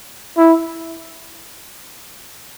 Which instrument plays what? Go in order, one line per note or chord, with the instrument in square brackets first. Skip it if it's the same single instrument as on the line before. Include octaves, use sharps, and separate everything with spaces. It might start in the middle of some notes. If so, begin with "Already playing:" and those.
[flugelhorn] E4